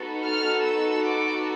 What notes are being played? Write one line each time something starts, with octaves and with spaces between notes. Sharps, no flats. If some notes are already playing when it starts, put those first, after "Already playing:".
Already playing: B3 D#4 F#4 A4
F6
E6
D6